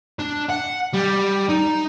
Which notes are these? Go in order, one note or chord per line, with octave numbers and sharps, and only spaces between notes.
D4
F#5
G3
D#4